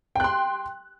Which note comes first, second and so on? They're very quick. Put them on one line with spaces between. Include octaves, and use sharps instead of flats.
G5 F#6 C6